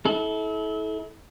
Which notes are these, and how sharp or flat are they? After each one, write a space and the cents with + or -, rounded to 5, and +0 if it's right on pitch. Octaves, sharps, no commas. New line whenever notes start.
E4 -35 A4 -30